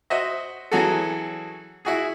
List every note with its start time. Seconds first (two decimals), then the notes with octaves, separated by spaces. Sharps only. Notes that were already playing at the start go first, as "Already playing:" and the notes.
0.10 F#4 C5 D#5 E5
0.71 E3 F#3 C#4 F#4 G#4 A4
1.85 E4 F#4 G#4